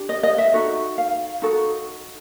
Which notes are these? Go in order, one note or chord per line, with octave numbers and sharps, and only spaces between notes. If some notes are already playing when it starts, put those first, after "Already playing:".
Already playing: D4 G4
D#5
D#5
E5
D#4 F#4 A4
F5
D#4 F#4 A4